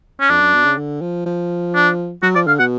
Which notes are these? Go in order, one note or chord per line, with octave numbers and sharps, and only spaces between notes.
C#4
F2 D4
F#2
B2
C#3
D3
F3
F3
D4
F#3 F#4
F3 D5
D3 F5
B2 F#5